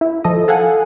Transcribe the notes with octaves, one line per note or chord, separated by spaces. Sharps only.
E4
F3 A4 D#5
A4 F5 F#5 G#5